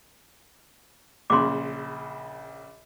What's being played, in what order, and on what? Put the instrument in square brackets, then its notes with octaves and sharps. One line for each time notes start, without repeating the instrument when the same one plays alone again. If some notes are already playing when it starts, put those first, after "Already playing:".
[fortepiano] A#1 C#3 [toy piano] C6 D6